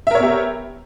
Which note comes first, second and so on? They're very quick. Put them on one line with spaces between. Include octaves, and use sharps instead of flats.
E5 A#4 C#5 B3 G4